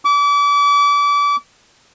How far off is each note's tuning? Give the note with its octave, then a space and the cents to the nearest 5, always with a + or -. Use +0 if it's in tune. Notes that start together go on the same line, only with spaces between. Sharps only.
D6 -35